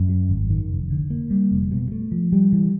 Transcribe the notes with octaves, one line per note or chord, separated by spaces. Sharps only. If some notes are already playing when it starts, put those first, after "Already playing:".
Already playing: F#2
F#3
G#1
D#3
F1
D3
A#3
G3
F1
B2
A3
F3
G3
E3